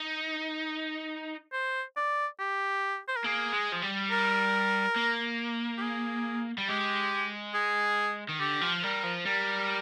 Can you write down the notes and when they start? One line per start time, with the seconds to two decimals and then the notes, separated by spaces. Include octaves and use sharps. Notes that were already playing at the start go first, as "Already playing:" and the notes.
Already playing: D#4
1.52 C5
1.96 D5
2.39 G4
3.08 C5
3.16 A#4
3.24 A#3 G#4
3.53 G#3
3.72 F3
3.82 G3
4.11 A#4
4.96 A#3
5.77 G4
5.82 G#4
6.58 G3
6.68 G#3 G4
7.54 G#4
8.29 D#3
8.39 D3 G4
8.61 F3
8.83 G3 A#4
9.04 F3
9.25 G3 A#4